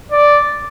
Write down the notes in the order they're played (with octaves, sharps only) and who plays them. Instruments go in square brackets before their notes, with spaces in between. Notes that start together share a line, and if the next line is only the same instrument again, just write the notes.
[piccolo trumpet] D5